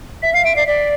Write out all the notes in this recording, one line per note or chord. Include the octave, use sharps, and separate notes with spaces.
E5 B6
F5 C7
E5 D7
D5 C7
D5 B6